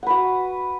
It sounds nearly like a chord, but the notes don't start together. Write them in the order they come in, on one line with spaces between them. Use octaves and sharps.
F#5 B4 F#4